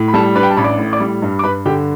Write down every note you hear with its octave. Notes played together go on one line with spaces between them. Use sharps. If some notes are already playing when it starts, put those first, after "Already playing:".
Already playing: A2
B5
G3 A4 A5
D4 B4 B5
G5
A5
A1 B5
D5 D6
A2
D5 D6
G3
G2
D6
G2 B4 B5
D3 G4 G5